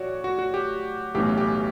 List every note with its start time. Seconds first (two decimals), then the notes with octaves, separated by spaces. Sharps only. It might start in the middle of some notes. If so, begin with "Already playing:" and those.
Already playing: A1 A2 F#3 F#4 C#5 D5
0.24 F#4
0.39 F#4
0.54 G4
1.15 B1 A2 E3 A3 C#4 G4
1.38 G4